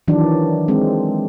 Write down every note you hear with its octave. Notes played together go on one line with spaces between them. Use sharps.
D#3 E3 F#3 D4
G#3 C4